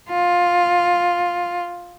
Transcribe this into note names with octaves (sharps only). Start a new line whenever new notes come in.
F4